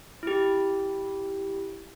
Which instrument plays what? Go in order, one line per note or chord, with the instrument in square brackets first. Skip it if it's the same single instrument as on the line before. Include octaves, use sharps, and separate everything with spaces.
[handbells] E4 G4